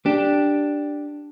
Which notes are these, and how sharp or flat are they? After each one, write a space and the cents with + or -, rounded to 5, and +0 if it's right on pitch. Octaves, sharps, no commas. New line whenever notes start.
D4 +0 G4 +0